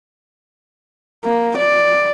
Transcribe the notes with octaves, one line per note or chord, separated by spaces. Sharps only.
A#3
D5